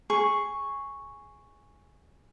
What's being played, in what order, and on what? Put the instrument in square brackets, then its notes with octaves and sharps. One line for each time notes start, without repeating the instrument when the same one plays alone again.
[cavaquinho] G#4 C#6